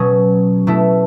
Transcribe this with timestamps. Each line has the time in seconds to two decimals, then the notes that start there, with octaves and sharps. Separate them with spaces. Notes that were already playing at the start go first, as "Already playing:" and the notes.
Already playing: B2 F#3 C#4 G#4
0.67 B2 A3 E4